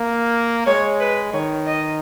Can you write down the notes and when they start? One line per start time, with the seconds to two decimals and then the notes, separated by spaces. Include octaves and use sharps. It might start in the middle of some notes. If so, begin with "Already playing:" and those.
Already playing: A#3
0.67 G#3 C#5
1.00 B4
1.33 D#3 C#5
1.66 D#5